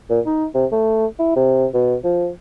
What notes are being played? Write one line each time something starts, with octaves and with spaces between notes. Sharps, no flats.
A#2
D#4
C3
A3
E4
C3
B2
F3